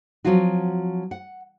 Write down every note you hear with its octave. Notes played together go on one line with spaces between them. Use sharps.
F3 F#3 C4 F4 F#4
F#5